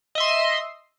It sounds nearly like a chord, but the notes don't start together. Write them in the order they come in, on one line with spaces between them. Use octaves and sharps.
D#5 E5 C6